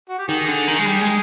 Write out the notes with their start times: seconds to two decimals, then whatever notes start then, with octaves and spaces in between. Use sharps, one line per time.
0.09 F#4
0.18 G4
0.28 D#3 G#4
0.48 D3
0.67 D#3
0.79 G#3
0.87 G3
1.01 G#3